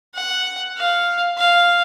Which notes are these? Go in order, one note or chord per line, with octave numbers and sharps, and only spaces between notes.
F#5
F5
F5